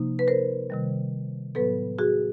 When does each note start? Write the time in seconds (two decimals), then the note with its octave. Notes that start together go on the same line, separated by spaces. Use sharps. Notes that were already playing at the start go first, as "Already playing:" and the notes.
Already playing: C3 F3 A#3 D#4
0.19 B4
0.28 A#4 C5
0.70 C3 D#3 G3
1.55 A2 F#3 B3 A4 B4
1.99 F#4 G#4